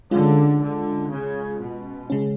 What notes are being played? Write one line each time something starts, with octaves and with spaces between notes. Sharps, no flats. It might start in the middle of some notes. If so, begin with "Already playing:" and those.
D3 G#3 C#4 F4
D3
C#3
B2
C#3 G#3 C#4